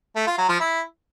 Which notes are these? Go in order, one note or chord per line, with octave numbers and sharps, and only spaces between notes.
A3
F4
F#3
F3
E4